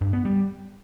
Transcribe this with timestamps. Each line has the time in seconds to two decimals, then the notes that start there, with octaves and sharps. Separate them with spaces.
0.01 G2
0.13 B3
0.25 G3